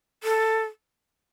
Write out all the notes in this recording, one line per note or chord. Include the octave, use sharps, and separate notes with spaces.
A4